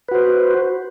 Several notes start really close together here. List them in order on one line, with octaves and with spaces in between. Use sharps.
B4 F#4 C5